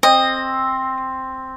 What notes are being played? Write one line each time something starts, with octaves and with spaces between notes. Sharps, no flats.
C4 D#5